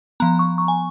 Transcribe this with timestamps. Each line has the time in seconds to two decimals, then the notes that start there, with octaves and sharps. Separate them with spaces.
0.20 F3 B3 A#5
0.39 C#6
0.58 C#6
0.68 G#5